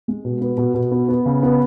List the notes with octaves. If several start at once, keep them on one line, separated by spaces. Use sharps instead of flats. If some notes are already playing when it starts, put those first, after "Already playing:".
G#3
B2
B3
B2
B2
B3
B3
C#3
B3